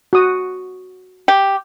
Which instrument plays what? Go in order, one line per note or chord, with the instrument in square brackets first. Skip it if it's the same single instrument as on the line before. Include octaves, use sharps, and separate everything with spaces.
[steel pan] F#4 D#6
[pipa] G4